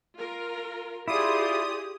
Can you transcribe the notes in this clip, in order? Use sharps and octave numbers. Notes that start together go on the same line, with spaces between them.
F4 A#4
E4 F4 G4 G#4 D5 C6 D6 D#6